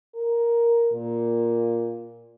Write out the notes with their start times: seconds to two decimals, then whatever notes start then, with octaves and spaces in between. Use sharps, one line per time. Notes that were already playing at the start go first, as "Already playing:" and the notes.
0.15 A#4
0.92 A#2